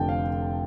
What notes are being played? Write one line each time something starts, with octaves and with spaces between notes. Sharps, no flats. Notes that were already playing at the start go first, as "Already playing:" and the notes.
Already playing: F1 F2 D3 G5 A5
F5